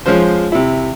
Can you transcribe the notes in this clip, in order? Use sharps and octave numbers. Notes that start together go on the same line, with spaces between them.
F3 G#3 C#4 F4 C5
C3 E4